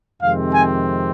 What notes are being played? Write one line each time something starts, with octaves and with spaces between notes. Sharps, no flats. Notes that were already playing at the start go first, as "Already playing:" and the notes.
F2 C3 D#3 G#3 C4 F5
G#5